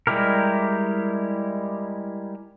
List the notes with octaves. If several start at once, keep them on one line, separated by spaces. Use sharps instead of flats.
G3 G#3 E4 G4 A#4